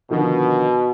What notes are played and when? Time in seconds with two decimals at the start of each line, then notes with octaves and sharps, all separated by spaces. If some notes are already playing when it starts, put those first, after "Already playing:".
0.11 B2 D3 D#3 F3